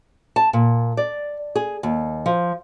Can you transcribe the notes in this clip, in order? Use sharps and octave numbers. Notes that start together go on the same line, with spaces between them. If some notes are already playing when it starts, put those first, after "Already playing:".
A5
A#2
D5
G#4
D#2
F3